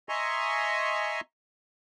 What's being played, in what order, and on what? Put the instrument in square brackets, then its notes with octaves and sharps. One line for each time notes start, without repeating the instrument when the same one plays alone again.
[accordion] D#5 E5 G#5 A#5 C6 C#6